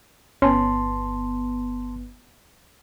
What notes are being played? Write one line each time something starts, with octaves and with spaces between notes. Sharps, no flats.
G1 B3 C#4 A5 C6